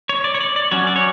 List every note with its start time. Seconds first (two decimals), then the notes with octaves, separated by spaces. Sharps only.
0.09 C#5
0.24 D5
0.34 C#5
0.40 D5
0.56 D5
0.71 F#3 C#4 C#5
0.87 D5
0.96 C#5